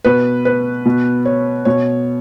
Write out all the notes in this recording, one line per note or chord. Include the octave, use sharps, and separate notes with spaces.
B2 B4
B4
B2
C#5
B2 C#5